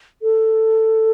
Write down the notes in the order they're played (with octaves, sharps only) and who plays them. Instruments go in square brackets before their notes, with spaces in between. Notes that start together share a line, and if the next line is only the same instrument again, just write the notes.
[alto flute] A4